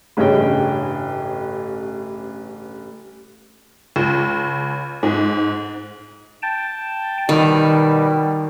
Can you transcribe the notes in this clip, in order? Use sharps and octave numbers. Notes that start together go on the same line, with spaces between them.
A1 G2 C#3 C#5 D#5 G5
C#2
G#2
G5 A5
B2 D#3 G3